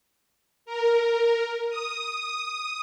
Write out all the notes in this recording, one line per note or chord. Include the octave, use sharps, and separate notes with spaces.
A#4
D#6